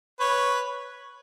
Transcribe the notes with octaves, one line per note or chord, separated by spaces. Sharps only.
B4 C#5